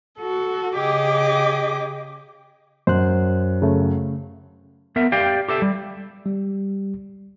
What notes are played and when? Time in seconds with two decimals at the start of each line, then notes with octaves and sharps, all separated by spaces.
0.19 F#4 A4
0.76 C#3 G4 G#4 D#5 D6
2.87 F#2 C5 F#6
3.62 C#3 A3
4.96 B3 A#4 E5
5.12 G4 D5 F5 G5
5.48 G4 A4 E5
5.62 G3
6.26 G3